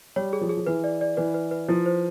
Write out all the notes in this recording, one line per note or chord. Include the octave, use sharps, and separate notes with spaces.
G3 C#5
G#4
F3
G#4
F3
E3 B4
D5
D5
E3 B4
B4
B4
F3 E4
C5